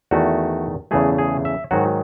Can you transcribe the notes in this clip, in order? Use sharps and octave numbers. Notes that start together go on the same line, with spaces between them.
E2 D#3 A3 F#4
E2 C#3 E3 A3 G#4
G#4
E5
G#2 D#3 F#3 F#4